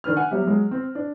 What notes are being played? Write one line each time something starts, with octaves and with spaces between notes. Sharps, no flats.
D#3 D4 B4 F6
F#5 G#5
F#3 G3 B3 G4 E5
F#3 G#3
C4
D4